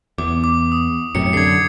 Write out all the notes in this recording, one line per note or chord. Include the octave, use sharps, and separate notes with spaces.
E2 D6
D6
D#6
F#2 A2 C3 C#7
F#2 D3 G#6 C7